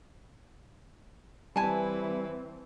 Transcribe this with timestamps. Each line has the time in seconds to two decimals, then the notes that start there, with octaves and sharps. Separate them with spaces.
1.56 E3 G3 C4 E4 B4 G#5 A5